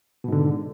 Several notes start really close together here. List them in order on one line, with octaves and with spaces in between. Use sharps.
B2 G#2 D3